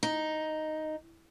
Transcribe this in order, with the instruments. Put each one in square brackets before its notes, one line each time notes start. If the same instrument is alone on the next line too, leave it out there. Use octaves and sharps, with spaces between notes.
[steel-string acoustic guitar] D#4